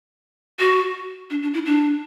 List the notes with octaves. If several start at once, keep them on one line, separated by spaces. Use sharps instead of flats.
F#4
D4
D4
E4
D4